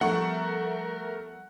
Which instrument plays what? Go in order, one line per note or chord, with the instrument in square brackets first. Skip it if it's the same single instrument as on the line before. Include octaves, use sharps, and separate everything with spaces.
[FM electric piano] F3 G3 B3 [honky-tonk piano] A3 C#6 [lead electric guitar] A#4 [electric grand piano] F#5